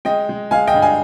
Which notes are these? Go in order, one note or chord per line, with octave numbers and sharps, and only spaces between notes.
G#3 D#5 G5
G#3
G#3 F5 G#5
D#5 G5
G2
F5 G#5